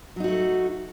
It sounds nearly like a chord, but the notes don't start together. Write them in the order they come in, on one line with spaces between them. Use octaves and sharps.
F#3 D#4 F#4 A3